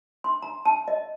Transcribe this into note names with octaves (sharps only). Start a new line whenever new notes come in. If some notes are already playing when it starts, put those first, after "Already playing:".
C6
A#5
A5
D#5